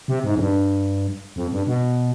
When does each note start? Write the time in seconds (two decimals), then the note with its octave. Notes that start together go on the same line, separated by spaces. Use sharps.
0.08 C3
0.24 G#2
0.36 F2
0.40 G2
1.36 F2
1.52 G2
1.67 B2